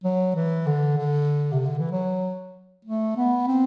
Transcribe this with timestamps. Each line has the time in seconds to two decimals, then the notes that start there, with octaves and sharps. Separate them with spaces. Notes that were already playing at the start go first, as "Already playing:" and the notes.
0.04 F#3
0.36 E3
0.67 D3
0.98 D3
1.53 C3
1.66 D3
1.79 E3
1.92 F#3
2.85 A3
3.17 B3
3.48 C4